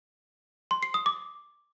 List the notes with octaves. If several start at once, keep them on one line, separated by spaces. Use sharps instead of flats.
C6
C7
D#6
D6